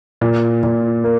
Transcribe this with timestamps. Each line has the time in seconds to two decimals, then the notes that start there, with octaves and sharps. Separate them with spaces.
0.21 A#2
0.63 A#2
1.04 A#3